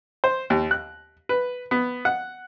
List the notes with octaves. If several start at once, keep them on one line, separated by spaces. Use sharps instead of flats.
C5
D#2
F#6
B4
B3
F#5